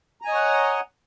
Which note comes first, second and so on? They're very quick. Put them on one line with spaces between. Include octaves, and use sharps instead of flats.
A#5 G#5 D#5 C#5 F#5